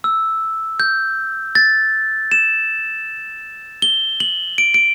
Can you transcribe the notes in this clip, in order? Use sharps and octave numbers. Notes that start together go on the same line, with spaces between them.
E6
G6
A6
E7
G7
F#7
D7
D7